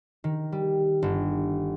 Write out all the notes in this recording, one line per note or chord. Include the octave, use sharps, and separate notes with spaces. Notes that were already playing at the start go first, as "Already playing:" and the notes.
D#3
G3
G1